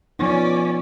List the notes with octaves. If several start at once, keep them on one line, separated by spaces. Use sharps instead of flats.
F3 B3 C#4 D#4 D5